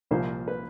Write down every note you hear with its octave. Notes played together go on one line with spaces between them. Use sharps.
C2 A#2 F3 C5
B4